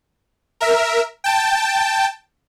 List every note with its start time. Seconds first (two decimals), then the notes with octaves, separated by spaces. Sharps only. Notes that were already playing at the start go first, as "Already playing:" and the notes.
0.60 A#4 E5
1.24 G5 A5